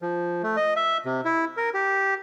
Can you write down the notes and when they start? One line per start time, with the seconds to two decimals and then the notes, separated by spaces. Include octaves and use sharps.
0.02 F3
0.43 A3
0.57 D#5
0.76 E5
1.05 C3
1.25 E4
1.57 A#4
1.74 G4